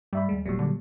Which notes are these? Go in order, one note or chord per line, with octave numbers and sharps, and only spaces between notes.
G2 G3 E5 B5
D#2 G#3
F1 A#2 F#3 G3
D3